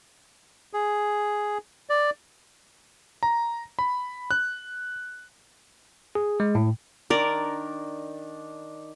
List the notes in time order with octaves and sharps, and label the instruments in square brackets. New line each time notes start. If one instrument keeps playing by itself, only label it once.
[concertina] G#4
D5
[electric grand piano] A#5
B5
F#6
[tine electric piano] G#4
G#3
A2
[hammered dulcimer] D#3 D4 [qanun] A#4 D5